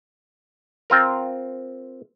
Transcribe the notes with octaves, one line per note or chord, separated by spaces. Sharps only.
C4 F4 A#4